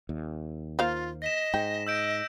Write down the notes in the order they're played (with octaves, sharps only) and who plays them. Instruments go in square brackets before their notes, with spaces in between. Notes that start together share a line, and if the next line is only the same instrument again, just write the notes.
[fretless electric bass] D#2
[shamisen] A#3 C5 F5 [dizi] F4
[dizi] D#5 [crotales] A#6 B6 E7
[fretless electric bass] G#2 [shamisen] G5
[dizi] D#5 [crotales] E6 G6 D7